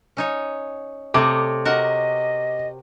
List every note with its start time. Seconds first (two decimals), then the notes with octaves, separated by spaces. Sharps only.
0.17 C#4 D#4 C#5
1.14 C3 A3 C#5 D#5 D6
1.65 F#4 A#4 D#5 F#5